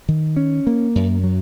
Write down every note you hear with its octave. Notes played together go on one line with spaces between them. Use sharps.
D#3
C#4
A#3
F#2
F#3